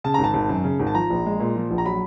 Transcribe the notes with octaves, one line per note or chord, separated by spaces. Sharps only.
C#3 A5
G#1 A#5
A5
G#1
F#2
C#3
G#1
A5
F3 A#5
A#1
G#3
A#2
F3
A#1
A#5
F#3 B5